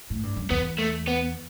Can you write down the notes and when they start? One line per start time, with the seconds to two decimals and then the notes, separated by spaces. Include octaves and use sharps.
0.10 A2
0.23 G2
0.36 F#2
0.50 E2 B3
0.78 A3
1.07 B3